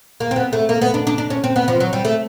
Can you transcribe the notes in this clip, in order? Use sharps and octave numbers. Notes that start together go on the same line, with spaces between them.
A#3
C4
B3
A3
A#3
B3
D4
D4
D4
C#4
C4
B3
F3
F#3
G3
A3